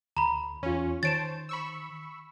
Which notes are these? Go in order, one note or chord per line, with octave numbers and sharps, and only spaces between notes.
D2 A#5 B5
E2 C#4 F4
D#3 C5 C#5 A5 A6 D7 E7
B5 C#6 E6